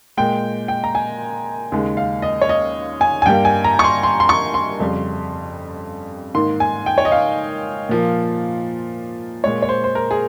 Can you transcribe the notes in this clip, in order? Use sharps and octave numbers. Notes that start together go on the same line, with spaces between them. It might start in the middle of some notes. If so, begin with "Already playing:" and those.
A#2 G#3 G5
G5
A#5
G#5
D#2 C#3 G#3
F5
D#5
C#5
D#5
G#5
G#5
G2 G3 A#3 G5
G#5
A#5
C#6
C6
C6
C6
C#6
C6
F2 C#3 G3
G#2 D#3 A#3 C6
G#5
G5
C#5
D#5
F5
A#2 F3 A#3
A#2 G#3 C#5
C#5
C5
C5
A#4
G#4